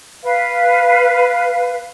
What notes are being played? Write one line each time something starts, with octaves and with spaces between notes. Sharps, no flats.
B4 F5